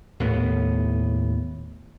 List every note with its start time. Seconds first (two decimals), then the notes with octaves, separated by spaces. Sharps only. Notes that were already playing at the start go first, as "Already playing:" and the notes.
0.20 D#2 A2 B3